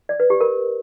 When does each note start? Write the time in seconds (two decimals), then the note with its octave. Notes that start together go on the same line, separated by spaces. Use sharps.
0.09 D5
0.20 B4
0.30 G4
0.41 A#4